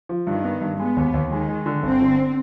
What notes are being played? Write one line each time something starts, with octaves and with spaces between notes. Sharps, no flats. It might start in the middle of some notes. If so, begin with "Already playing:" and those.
F3
G2 D#3
B3
G2
G#3 B3
D#2
D#2
D#3 G#3
G#3
D3
G1 C4
D3